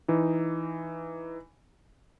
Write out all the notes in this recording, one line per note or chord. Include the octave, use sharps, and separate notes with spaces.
E3 D#4